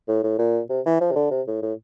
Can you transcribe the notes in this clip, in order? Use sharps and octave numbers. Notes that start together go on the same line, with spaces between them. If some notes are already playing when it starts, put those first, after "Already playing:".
A2
A2
A#2
C3
E3
F3
C3
D3
C3
A2
A2